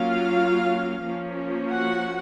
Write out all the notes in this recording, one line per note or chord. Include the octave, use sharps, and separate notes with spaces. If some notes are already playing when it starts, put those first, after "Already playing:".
Already playing: F#3 A#3 C#4 F4 F5
F3 A#3 C#4
F#4 F#5